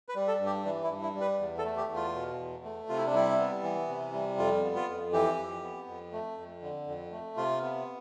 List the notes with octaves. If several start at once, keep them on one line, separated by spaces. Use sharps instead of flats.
B4
G3
A4
G2
G4
E3 D4
E4
G2
E4
G3
B4
E2
A4
A3
G4
E2
F4
B2
E2
A3
C3 F4
E4
D4
G3 E4
B3
E3
C3
G3
F2 F4
B3
F4
F2
E3 G4
F2
B3
F2
A3
F2
D3
F2
A3
C3 F4
B3